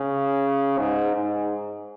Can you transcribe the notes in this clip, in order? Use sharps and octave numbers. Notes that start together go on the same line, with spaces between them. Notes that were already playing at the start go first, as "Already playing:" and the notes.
Already playing: C#3
G#2
G#2